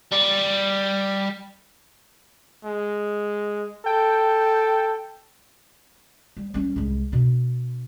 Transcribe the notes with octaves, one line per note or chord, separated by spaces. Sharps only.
G3
G#3
A4 G5
G3
G3 C#4
C2 G#3
B2 D4